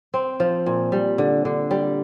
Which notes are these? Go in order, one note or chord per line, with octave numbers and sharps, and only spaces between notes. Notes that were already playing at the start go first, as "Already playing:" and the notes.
C4
F3
A#2
G3
D3
D3
G3